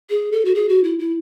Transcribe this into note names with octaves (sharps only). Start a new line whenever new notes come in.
G#4
A4
F#4
G#4
F#4
E4
E4